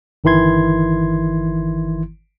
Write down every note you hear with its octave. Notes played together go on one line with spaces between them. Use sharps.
G1 D#3 E3 E4 C6 G#6